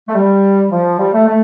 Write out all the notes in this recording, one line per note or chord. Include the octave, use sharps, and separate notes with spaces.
A3
G3
F3
G3
A3
A3